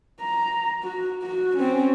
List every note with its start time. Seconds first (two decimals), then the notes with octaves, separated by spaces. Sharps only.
0.21 A#5
0.83 F#4
1.23 F#4
1.57 C4 C#4